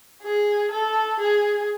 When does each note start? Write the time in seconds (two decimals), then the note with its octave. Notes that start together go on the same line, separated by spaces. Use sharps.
0.23 G#4
0.71 A4
1.20 G#4